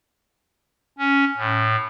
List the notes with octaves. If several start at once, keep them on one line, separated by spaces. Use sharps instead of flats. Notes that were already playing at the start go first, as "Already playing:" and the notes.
C#4
A2